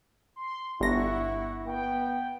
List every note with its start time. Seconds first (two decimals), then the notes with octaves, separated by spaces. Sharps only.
0.36 C6
0.81 G1 E4 F#5 C#6 A#6
1.66 B3 G5